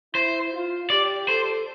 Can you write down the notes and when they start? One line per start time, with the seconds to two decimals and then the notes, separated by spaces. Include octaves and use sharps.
0.14 E4 C5
0.53 F4
0.90 G4 D5
1.28 A4 C5